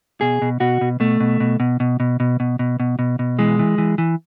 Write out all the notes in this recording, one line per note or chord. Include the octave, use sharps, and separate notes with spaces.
B2 G#4
B2
B2 F#4
B2
B2 A3
B2
B2
B2
B2
B2
B2
B2
B2
B2
B2
B2
E3 G#3
E3
E3
E3